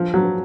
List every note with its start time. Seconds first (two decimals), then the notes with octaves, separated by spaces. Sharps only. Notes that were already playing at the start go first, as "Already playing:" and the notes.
Already playing: F3
0.14 F#3